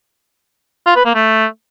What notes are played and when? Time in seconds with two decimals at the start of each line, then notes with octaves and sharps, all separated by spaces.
0.86 F4
0.96 B4
1.05 A#3
1.15 A3